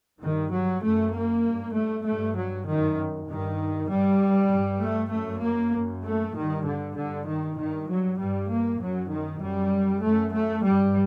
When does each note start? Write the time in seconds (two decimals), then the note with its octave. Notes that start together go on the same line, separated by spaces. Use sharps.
0.21 G2 D#3
0.51 F#3
0.82 F#2 A3
1.12 A#3
1.44 G2
1.74 A3
2.04 G2 A3
2.35 F#3
2.65 F#2 D#3
3.27 G2 D#3
3.88 G2 G3
4.49 G2
4.81 A3
5.11 F#2 A3
5.41 A#3
5.73 F#2
6.03 A3
6.34 G2 D#3
6.64 D3
6.95 G2 D3
7.26 D#3
7.56 G2 D#3
7.87 F#3
8.17 G2 G3
8.49 A#3
8.79 F#2 F#3
9.09 D#3
9.40 F#2 G3
10.01 F#2 A3
10.32 A3
10.63 G2 G3